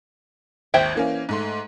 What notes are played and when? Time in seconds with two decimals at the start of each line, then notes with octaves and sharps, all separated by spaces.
0.74 G#1 D#2 C5 E5 G5 G#6
0.95 E3 A#3 C#4
1.29 G#2 A3 C6